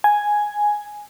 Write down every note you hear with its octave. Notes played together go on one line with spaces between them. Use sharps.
G#5